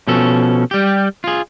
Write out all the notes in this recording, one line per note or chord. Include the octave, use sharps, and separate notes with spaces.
B2 F3 C#4 A4
G3 G4
F4 G#4